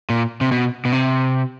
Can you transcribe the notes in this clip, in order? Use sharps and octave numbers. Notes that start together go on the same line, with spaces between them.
A#2
C3
B2
B2
C3